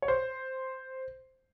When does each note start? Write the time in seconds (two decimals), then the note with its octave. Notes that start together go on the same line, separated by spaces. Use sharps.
0.02 C#5
0.08 C5